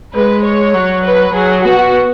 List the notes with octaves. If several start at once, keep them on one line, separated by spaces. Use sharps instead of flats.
G#3 B4
C#5
F#3
B4
F#3 G#4
B3 F#4